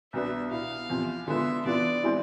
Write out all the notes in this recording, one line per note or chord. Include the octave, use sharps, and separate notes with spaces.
C2 B2 B3 D4 E5
B2 B3 E4 F5
E2 C3 F3
D3 G#3 B3 F4 E5
C3 E3 B3 D4 F4 D5
E3 G#3 C4 E4 G#4